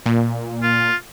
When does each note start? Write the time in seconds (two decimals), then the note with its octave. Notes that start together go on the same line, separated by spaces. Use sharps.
0.06 A#2
0.63 F4